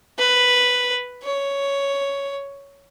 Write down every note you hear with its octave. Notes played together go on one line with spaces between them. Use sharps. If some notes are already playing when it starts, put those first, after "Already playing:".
B4
C#5